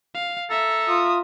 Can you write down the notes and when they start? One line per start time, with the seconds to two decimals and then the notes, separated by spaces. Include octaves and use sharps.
0.15 F5
0.50 A4 E5 A#5
0.88 F4 D#6